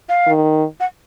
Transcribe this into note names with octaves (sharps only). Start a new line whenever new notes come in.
F5
D#3
F#5